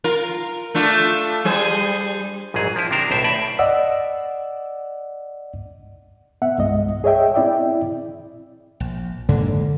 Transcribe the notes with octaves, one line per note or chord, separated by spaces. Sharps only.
F4 A#4
A3 D4 F4
G3 G#4 C5
A#1 G#2 F#3 G#4
F3 E4
C3 D#3 D4 A#4 C5
B1 A2 C5 E5
A2 D5 E5
D5 D#5 F#5 E6
B3 E5 F#5
C2 G2 G#3 D#5
G#4 C#5 D#5 E5 G5
C4 E4 D5 E5 G5
A#1
F2 G#2 D3 A#3